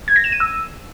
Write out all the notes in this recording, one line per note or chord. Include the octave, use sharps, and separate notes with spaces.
G#6
A#6
E7
D#7
E6